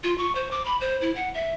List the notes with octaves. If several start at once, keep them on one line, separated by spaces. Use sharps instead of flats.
F4
C#6
C5
D6
B5
C5
E4
F#5
E5